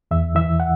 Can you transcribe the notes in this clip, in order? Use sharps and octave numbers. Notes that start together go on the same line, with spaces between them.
E2 E5
E3 E5
F#5